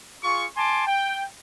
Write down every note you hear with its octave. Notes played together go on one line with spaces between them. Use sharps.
F4 G#4 C#6
G#5 A5 C6 D6
G5